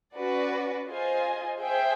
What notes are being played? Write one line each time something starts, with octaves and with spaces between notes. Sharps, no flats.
C#4 F#4 B4 D5
F4 G#4 C5 D#5 G#5
G#4 C5 E5 G5